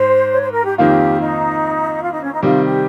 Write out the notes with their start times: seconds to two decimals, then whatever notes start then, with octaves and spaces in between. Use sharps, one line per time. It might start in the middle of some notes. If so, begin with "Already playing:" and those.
Already playing: G#2 C5
0.32 C#5
0.42 C5
0.51 A#4
0.65 G4
0.78 F2 D#3 A#3 F4 G4
1.20 D#4
2.02 F4
2.12 D#4
2.23 C#4
2.32 D#4
2.43 C3 D#3 G3 F4
2.64 G4